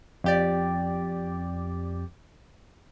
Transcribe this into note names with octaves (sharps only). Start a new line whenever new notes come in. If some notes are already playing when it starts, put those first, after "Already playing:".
F2 G4 D5